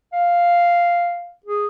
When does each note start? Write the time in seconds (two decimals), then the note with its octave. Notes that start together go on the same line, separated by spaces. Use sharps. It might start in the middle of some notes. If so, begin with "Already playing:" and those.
0.13 F5
1.46 G#4